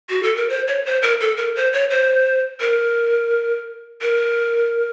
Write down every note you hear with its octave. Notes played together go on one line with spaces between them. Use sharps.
F#4
A4
A#4
C5
C#5
C5
A#4
A4
A#4
C5
C#5
C5
A#4
A#4